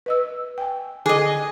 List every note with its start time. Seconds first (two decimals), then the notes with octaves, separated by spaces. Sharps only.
0.06 B4 D#5 E6
0.58 G5 G#5
1.06 D3 G#4 A4 D#5 D6